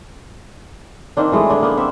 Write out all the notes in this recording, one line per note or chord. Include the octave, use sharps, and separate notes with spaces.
D#3 A#3 C4 D4
E3 G#3 A3 G#4
D3 D4
A#3 B3
A#3 C4 E5 F#5